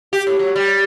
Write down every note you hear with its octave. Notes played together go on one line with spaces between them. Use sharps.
G4
A2
F#3
G3